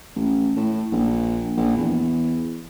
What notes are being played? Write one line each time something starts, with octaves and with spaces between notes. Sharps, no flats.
A1
A2
A#1
A#1
E2